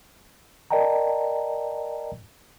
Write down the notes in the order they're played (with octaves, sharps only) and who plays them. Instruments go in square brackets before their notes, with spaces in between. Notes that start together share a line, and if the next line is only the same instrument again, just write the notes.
[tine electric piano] A#4 D5 D#5 G5 A5 A#5